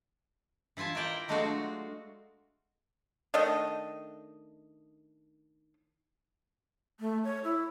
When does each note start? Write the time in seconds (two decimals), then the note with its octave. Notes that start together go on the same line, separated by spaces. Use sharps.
0.77 E3 E4 F4 G#5 A5
0.95 E4 F4 A#4 D5 G5 A#5
1.28 F#3 G#3 A3 D4 F4 F#4
3.34 D#3 A3 D4 D#5
7.00 A3
7.24 C#5
7.44 E4